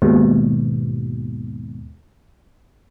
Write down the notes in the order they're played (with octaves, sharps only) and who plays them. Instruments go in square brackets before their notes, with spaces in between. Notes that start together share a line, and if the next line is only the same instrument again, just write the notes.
[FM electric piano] D#2 G#2 B2